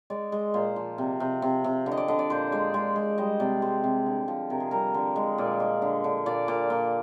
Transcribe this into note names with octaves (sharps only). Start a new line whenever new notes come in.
G#3 D5
G#3
A#2 C5
F3
C3
C3
C3
C3
D3
D#5
D5
D3 D#5
D5
A#2 C5
G#3 D5
G#3 D5
G#3
G3 D#5
C3 D5
G#3 C5
C3
D3
F3
C3 A#4
G#4
G3 A#4
D3
G#3
A#2 D5
G#3
D3
D3
A#2 D5
A#2 D5
A#2